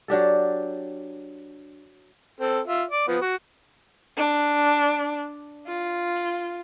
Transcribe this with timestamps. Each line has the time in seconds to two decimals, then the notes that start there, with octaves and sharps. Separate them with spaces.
0.08 F#3 D4 G4 A4
2.40 C4 A4
2.67 F4 E5
2.91 D5
3.08 F3 B3
3.22 F#4
4.17 D4
5.67 F4